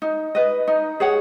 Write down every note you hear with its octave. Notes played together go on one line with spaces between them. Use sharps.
D#4
B4 D#5
D#4
G#4 C#5 F#5